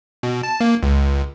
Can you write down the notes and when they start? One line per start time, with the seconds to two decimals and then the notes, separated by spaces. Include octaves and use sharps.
0.23 B2
0.43 A5
0.61 A#3
0.83 C#2